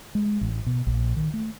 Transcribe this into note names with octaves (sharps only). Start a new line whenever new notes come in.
G#3
A1
B2
A#1
D#3
A3